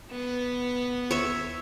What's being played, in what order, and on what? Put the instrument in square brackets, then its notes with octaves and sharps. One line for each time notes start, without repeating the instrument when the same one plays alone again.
[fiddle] B3
[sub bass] F1
[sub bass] D#2 [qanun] C#5 E5